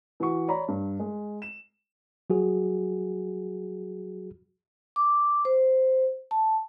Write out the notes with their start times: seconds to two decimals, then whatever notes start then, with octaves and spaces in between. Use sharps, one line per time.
0.20 E3 F#4 C#6
0.48 C#5 D5 A#5 B5 C#6
0.68 G2
1.00 G#3
1.42 E7
2.30 F#3 F#4 G#4
4.96 D6
5.45 C5
6.31 A5